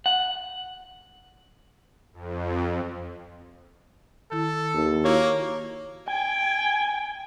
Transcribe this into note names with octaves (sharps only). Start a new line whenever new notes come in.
F#5
F2
D#3 E4 A4
D#2
A#3 E4 F#4 C#5
G5 G#5